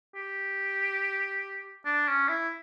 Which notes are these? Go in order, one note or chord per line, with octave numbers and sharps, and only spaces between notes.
G4
D4
C#4
E4